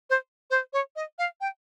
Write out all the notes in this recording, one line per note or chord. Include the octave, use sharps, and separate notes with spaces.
C5
C5
C#5
D#5
F5
G5